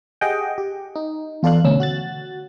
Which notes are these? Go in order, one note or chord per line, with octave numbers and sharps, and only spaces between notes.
G4 G#4 D#5 F#5 G5
G4
D#4
E2 F4 A4 D5 F5 F#6
D2 B2 C#4 E6
F#4 F#6 A6